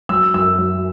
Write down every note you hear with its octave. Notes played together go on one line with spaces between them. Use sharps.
F#3 E6
F#2 E6
F#3